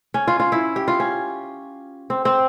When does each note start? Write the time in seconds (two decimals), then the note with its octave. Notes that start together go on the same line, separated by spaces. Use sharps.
0.14 C#4
0.28 F4
0.40 F4
0.52 E4
0.76 G4
0.88 F4
1.00 C#4
2.10 C4
2.25 C4